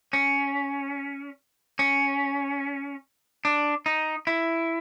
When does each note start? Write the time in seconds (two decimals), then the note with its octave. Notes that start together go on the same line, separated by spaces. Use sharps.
0.13 C#4
1.79 C#4
3.45 D4
3.86 D#4
4.27 E4